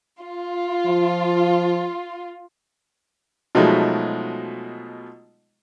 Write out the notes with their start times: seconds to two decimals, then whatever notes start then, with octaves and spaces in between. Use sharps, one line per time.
0.20 F4
0.86 F3
3.55 B2 F3 F#3 G#3 A3 D#4